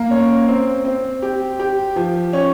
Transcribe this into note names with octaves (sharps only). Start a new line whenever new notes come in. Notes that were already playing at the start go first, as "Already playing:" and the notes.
Already playing: A#3
C#4
C4
C4
G4
G4
F3
C#4